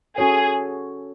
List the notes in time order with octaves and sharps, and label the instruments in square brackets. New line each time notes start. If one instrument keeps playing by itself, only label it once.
[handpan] C#4 F#4 A4 C#5 [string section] G#4